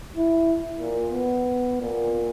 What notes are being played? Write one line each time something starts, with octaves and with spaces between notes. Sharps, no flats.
E4
A#2
B3
A#2